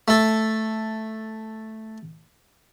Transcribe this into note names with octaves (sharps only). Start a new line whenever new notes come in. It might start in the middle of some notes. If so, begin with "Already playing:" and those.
A3 A4